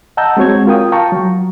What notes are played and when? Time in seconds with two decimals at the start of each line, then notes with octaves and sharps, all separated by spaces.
0.17 D#5 F#5 A5 A#5 E6 G6
0.37 G#3 C4 F#4 C#5 G#6
0.67 F4 A#4 G5 D#6
0.92 F5 G5 A5 A#5 C#6
1.12 F#3